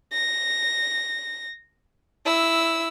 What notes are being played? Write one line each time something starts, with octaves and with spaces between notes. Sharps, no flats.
A#6
E4 E6